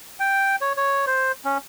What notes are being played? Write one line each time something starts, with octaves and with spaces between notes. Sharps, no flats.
G5
C#5
C#5
C5
C#4